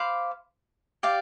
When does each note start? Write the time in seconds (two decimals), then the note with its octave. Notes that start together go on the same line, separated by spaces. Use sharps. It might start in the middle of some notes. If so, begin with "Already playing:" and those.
Already playing: C5 F5 B5 D6
1.03 G4 D5 F5